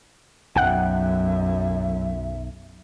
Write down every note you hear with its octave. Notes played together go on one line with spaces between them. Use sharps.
B1 F#2 E5 F#5 G5 F#6